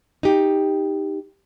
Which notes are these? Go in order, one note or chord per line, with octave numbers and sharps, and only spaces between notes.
D#4 G4